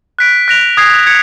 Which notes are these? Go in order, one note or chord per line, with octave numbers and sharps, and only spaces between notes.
F#6 B6 D7
F#6 A#6 D7 F7
D#6 G#6 C7
G#6 C#7